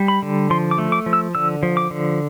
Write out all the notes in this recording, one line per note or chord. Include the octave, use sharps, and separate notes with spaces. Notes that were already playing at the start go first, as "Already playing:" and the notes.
Already playing: G3
B5
D3
F3 C6
D6
A3
D6
F3
E6
D3 E6
F3
D6
D3